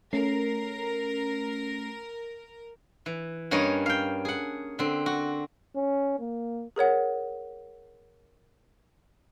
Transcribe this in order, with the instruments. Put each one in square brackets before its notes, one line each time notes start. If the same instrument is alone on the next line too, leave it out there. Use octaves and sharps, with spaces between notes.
[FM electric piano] A3 C#4 C7 [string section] A#4
[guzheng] E3
G2 A#3 C#4 C#5 D#5 A#5
F5 G5
G#4 F#5
D3 C4
F#4
[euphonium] C#4
A#3
[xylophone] G#4 A#4 C#5 F#5